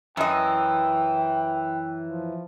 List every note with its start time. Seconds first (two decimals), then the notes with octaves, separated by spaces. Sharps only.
0.17 F#2 E3 D#5 G5
2.08 F3